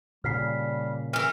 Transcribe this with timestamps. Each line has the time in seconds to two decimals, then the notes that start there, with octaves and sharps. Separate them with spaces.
0.24 A#2 C#3 G3 F6 B6 C7
1.13 E3 A#4 F6